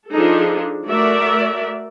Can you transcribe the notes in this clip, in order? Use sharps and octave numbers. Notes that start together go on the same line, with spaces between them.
F3 D4 D#4 G#4 A4
A3 F#4 A#4 D5 E5